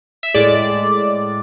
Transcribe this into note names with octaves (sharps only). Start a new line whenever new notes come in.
E5
A2 G#3 D5